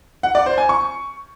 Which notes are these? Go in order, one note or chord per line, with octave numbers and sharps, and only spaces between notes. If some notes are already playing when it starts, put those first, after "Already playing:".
F#5
D5
C5
G#5
C#6